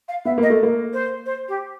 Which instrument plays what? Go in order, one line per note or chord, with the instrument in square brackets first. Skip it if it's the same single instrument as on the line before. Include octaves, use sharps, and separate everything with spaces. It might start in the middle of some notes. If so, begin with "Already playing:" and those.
[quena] F5
[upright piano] B3 [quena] E5
[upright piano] A#3 [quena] D#5
[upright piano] A3
A#3
[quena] C5
C5
G4